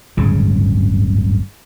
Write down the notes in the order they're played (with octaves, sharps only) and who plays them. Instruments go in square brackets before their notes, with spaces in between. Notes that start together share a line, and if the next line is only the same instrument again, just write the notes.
[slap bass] D1 G1 G#2 C#3